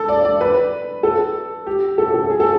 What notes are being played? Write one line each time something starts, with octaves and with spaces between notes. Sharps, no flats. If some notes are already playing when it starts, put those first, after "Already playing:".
Already playing: A4
D5
D5
B4
A4
G4
A4
A4
G#4
A4